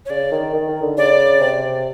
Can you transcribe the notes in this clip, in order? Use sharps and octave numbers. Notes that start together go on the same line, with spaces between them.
C#5
C#3 D5
D#3
D#3
D#3
D3
C#3 D5
C3